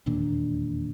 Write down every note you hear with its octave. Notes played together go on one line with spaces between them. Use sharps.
E1 D#2 A#2 D4